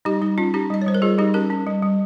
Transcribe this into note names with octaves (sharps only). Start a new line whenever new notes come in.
G3 D#4 G4
G3 D#4
C#4 F4
C#4 D#4 G4
G3 D#5
C#5
G3 C5
A#4
G3 F4 G#4
G3 D#4 G4
C#4 G4 A#4
C#4
G3
G3